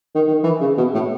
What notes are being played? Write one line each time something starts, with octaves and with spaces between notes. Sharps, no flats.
D#3
D#3
E3
C#3
B2
A2